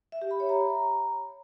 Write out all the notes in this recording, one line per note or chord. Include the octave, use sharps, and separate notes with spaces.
E5
G4
B5
C#5
A#5